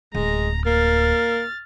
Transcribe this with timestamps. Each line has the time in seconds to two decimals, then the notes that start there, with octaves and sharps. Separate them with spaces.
0.15 D1 G#3 A#5
0.66 A#3 F6 A6